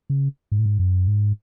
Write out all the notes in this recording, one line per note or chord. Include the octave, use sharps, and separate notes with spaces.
C#3
G#2
A2
G#2
F#2
G#2